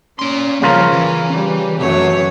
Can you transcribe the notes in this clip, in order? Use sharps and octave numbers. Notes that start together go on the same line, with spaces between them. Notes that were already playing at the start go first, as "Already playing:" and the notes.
A#3 C#4 C6
C#3 F3 G3 C#4 F4 A#4
E3
G3
F#2 A3 C#5